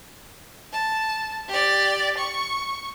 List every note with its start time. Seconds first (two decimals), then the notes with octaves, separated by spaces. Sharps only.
0.72 A5
1.48 G4 D5
2.17 C#6